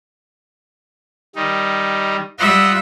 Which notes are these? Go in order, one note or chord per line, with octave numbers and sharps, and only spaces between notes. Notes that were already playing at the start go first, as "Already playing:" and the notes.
D#3 G3 D#4
G3 F4 D#5 E5 F#5